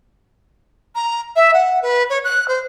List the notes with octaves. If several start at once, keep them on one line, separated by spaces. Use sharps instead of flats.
A#5
E5
F#5
B4
C#5
F#6
C5